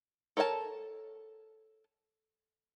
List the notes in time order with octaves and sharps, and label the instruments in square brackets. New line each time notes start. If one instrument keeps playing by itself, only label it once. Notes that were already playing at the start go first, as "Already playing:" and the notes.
[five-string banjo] A4 A#4 C#5 F5 A5